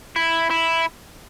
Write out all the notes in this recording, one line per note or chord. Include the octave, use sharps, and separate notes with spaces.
E4
E4